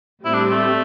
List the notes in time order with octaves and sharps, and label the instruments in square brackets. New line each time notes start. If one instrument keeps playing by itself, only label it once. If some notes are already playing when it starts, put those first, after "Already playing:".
[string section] A2 G3 C4 [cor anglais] E4
[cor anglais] D4
A3